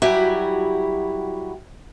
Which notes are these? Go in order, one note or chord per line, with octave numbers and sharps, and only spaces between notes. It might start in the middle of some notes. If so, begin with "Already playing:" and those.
F#3 G3 E4 F#4 G4 G#5